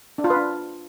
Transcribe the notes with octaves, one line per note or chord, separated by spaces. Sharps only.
D4
F4
B4
D4